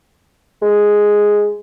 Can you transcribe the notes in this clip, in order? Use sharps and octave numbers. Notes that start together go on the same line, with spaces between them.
G#3